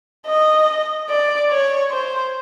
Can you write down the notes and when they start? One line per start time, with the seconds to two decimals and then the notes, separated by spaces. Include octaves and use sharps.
0.26 D#5
1.10 D5
1.50 C#5
1.91 C5